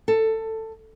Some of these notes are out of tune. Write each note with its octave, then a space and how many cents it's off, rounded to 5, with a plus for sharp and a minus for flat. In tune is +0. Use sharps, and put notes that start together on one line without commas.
A4 +15